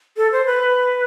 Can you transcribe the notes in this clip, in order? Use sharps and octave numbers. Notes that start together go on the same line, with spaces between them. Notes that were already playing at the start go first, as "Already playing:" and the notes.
A4
C5
B4